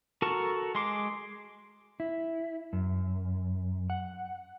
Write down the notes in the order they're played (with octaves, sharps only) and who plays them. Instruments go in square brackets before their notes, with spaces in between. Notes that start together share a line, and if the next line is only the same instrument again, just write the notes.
[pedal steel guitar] F#4 A4 A#4 A5 C#6
G#3 C6 D6
[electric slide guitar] E4
F#2
F#5